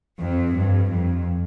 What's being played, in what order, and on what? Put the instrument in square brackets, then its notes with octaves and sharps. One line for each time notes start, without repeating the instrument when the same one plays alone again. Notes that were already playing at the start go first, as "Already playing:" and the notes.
[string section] F2
G2
F2